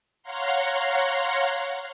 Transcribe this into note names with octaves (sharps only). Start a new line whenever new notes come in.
C#5 F5 F#5 A#5 C6